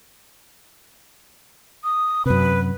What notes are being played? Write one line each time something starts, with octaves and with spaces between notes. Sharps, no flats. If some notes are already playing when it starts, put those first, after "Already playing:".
D#6
F#2 C3 B4